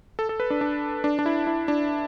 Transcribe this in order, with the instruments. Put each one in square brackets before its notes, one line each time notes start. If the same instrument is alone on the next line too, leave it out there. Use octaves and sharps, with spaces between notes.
[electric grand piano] A4
A4
B4
D4
D4
D4
D4
E4
E4
D4